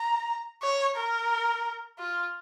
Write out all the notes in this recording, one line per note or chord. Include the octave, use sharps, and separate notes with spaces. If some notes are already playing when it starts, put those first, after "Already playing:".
Already playing: A#5
C#5
A#4
F4